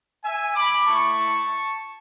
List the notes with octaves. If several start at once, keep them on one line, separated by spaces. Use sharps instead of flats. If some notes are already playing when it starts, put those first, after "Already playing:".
E5 G#5
B5 D6
A3 E4 A5 C#6